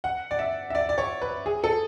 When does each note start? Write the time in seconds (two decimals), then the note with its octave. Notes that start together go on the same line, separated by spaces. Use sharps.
0.04 F#5
0.31 D5
0.39 E5
0.70 E5
0.75 D5
0.89 D5
0.98 C#5
1.22 B4
1.46 G#4
1.64 A4